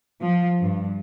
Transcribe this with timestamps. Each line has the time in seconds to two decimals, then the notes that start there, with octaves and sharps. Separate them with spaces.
0.23 F3
0.62 G2